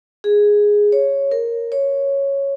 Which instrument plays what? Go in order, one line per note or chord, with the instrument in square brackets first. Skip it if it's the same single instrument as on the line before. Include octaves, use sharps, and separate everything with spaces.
[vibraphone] G#4
C#5
A#4
C#5